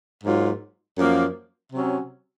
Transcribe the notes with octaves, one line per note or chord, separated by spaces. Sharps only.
G#2 F#3 A#3 F4
F#2 F3 A#3
C3 F#3 C#4